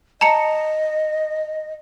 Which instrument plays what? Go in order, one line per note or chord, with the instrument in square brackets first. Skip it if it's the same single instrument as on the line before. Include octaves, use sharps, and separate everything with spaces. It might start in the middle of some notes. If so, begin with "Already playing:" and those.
[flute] D#5 [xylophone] A5 A#5 C#7